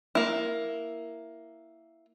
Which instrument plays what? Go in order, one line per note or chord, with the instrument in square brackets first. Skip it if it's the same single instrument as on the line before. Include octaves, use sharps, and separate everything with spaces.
[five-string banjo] A#3 E4